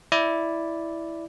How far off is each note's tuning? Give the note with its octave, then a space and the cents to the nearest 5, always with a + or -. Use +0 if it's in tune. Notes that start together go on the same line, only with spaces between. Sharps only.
E4 +0 D5 +0